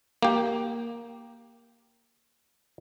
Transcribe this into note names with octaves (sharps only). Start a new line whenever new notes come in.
A#3 G4